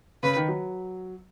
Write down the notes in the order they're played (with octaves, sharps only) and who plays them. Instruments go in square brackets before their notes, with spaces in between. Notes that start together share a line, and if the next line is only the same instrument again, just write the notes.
[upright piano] C#3 [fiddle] B4
[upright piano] D#3
F#3